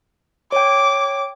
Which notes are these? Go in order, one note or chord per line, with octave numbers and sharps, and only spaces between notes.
C#5 G5 D6